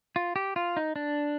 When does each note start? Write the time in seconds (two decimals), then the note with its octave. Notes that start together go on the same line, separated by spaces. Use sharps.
0.16 F4
0.36 G4
0.56 F4
0.77 D#4
0.96 D4